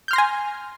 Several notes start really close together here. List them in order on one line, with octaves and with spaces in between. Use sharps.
G6 F6 C6 A#6 G#5